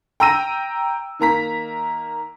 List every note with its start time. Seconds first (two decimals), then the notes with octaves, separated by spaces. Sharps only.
0.20 G5 A#5 E6 A#6 D#7
1.19 D#3 A#3 A#5 B6